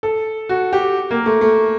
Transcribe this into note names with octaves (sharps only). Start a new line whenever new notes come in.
A4
F#4
G4
A#3
A3
A3